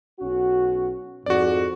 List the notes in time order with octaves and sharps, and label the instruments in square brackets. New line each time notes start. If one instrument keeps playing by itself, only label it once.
[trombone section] B1 C#4 F#4
[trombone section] F2 G#2 [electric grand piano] F#4 D5